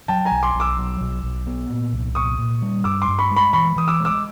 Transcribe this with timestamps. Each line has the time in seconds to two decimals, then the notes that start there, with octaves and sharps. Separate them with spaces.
0.08 F#3 G5 A5
0.25 G#5 A#5
0.32 B1
0.43 C6 D6
0.55 B1
0.60 D6 E6
0.78 F#3
1.01 B1
1.23 B1
1.47 B3
1.70 A#2
1.93 C2
2.15 A#2 C#6 D#6
2.39 A#2
2.62 G3
2.84 G2 D6 E6
3.02 C6 D6
3.08 G2
3.19 B5 C#6
3.31 G#3
3.36 B5 C#6
3.53 E3 B5 C#6
3.76 E3 D#6
3.88 D6 E6
4.00 G#3
4.05 D6 E6